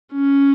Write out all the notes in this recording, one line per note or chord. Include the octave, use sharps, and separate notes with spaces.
C#4